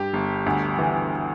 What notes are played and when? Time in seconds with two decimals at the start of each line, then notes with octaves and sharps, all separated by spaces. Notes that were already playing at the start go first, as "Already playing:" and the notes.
Already playing: G2 G4
0.13 G1
0.46 D2
0.79 E3